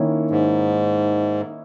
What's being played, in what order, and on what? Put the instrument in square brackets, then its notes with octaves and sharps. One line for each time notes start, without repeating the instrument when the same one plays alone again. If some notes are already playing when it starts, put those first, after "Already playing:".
Already playing: [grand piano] D#3 A#3 C#4 E4
[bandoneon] G#2